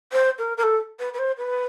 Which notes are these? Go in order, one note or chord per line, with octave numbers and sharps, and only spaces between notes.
C5
A#4
A#4
A4
B4
B4
C5
B4